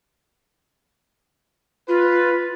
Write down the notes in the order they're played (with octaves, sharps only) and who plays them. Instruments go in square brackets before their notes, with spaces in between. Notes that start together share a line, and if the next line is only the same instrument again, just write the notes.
[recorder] F4 [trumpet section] B4